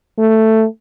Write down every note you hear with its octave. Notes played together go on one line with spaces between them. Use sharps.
A3